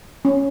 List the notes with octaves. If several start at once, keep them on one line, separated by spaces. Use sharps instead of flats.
C#4